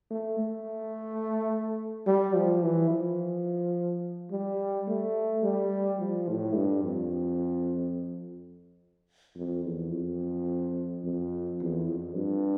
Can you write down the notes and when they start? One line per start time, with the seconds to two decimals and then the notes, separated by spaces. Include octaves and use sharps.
0.11 A3
0.39 A3
2.07 G3
2.35 F3
2.63 E3
2.90 F3
4.31 G3
4.88 A3
5.44 G3
6.00 F3
6.28 A2
6.55 G2
6.84 F2
9.36 F2
9.65 E2
9.92 F2
11.04 F2
11.60 E2
11.88 F2
12.16 G2